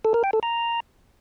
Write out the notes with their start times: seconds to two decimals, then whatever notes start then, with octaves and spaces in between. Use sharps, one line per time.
0.05 A4
0.14 A#4
0.24 G5
0.33 A4
0.43 A#5